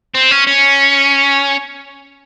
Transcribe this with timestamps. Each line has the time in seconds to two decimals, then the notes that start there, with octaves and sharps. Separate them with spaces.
0.14 C4
0.31 C#4
0.47 C#4